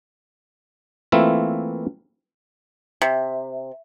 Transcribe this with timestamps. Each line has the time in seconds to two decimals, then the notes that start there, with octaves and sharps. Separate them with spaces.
1.12 E3 A3 A#3 C4 E4 F4
3.02 C3